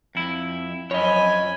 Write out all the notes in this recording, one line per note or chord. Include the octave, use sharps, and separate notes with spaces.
F2 E4
F#2 F3 C#5 D#5 G#5 B5